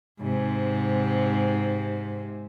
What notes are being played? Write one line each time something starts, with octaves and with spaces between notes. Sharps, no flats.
G#2 C3